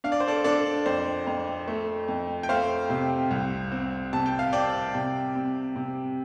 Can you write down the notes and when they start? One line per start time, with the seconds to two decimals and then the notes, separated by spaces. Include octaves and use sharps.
0.04 D4 F5
0.12 D5
0.20 C5
0.28 A4 D5
0.44 D4 A4 D5
0.86 F2 C5
1.27 F2
1.68 A3
2.08 F2
2.43 G5
2.49 A3 C5 F5
2.90 C3
3.31 C2
3.72 C4
4.13 C3 A5
4.26 G5
4.39 F5
4.53 C4 D5 G5
4.95 C3
5.35 C3
5.76 C3